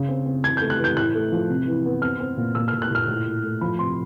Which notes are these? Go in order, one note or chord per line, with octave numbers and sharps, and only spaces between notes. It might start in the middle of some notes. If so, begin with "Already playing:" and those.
Already playing: C#3
C4
C4
E3 G#6
A3 G6
F#6
E3
G6
A2 F#6
A3
F3
C3
E3
B3
C4 F6
C4
A#2
A#2 E6
F6
A#2
F#6
A#2 F6
A2
A2
A3
F3 B5
C3 C6